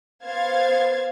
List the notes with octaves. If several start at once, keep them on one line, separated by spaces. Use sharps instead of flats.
B3 C5 F5 G#6 A6